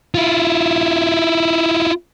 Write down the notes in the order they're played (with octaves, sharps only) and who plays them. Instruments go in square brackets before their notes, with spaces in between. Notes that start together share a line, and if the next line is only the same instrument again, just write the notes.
[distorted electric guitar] E4 F4